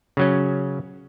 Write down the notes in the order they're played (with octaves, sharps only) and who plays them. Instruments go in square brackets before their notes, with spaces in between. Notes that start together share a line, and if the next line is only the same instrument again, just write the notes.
[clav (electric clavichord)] C#3 F#3 C#4